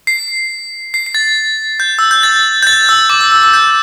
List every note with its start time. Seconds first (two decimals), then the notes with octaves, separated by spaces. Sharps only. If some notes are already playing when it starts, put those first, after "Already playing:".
0.07 C7
0.94 C7
1.06 C7
1.15 A6
1.80 G6
1.99 E6
2.11 G6
2.23 A6
2.63 G6
2.67 A6
2.89 E6
3.10 D6
3.21 E6
3.32 E6
3.43 E6
3.54 G6